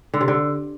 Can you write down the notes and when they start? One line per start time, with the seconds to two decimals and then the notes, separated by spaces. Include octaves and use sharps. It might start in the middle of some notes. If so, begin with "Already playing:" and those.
0.14 D3
0.21 C3
0.28 D3